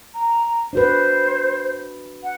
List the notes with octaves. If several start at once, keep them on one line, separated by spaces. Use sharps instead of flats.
A#5
D4 F#4 B4 C5
F#5